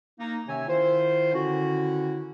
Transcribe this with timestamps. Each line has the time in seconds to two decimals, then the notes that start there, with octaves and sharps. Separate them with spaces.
0.19 A#3 D#4
0.48 C3 D#3 C#4 C#5 E5 G#5
0.68 D#3 E4 F4 C5
1.33 D3 D#3 C#4 E4 F#4